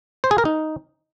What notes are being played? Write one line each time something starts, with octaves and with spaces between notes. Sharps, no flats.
C5
G#4
A#4
D#4